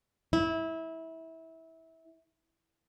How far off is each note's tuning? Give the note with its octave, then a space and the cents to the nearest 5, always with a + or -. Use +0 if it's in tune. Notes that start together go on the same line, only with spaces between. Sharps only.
E4 -20